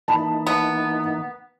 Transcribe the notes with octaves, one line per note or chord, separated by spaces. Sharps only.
E3 A#3 D#4 A5 B5
B3